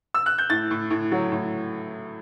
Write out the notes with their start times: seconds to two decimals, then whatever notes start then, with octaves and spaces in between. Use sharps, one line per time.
0.14 E6
0.26 F#6
0.38 G6
0.50 A2 A6
0.71 A2
0.90 A2
1.12 F#3
1.32 A2